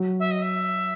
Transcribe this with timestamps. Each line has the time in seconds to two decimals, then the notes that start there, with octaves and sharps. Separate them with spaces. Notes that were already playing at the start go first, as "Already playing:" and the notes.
Already playing: F#3
0.20 E5
0.31 D#5
0.42 E5